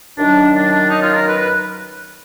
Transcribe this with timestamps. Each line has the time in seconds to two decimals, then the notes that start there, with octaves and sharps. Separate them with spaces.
0.18 F#2 D#3 F#3 D4
0.54 D4
0.72 D4
0.91 D#4
1.03 F4
1.14 A#4
1.27 B4
1.38 B4